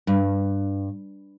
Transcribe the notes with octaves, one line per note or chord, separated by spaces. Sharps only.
G2